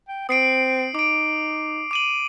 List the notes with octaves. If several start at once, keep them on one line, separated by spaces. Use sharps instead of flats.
G5
C4 D#6 C7 D7
D#4 D6 D7
D6 D#7 F#7